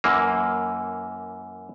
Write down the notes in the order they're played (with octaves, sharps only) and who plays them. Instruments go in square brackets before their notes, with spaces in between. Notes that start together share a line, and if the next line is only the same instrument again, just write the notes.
[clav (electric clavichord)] F#2 E3 A#3